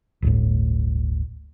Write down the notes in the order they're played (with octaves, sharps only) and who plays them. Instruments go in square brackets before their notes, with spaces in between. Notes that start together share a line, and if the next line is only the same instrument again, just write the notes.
[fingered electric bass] D1 G1 A2